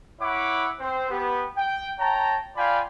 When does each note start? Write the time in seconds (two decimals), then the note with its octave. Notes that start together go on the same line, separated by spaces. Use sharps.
0.21 E4 C#5 E5 F#5 B5 D6
0.79 C4 C5
1.10 B3 G4
1.57 G5
1.99 C#5 G5 A5 A#5
2.56 F4 D5 F5 G5 G#5 B5